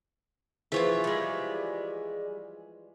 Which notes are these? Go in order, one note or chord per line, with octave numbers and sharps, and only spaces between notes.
E3 F3 F4 G#4 C#5 E5 C6
G3 G#3